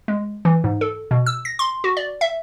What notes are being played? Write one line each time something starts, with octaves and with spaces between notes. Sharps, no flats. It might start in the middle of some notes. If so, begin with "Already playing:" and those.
G#3
E3
G#2
A4
B2
E6
A#6
C6
F#4
D5
E5